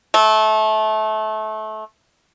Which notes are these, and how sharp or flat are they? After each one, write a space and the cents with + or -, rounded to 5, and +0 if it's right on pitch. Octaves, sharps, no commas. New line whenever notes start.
A3 -25